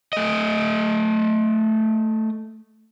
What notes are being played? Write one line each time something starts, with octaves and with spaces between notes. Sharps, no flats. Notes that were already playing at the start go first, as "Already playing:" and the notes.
A3 D#5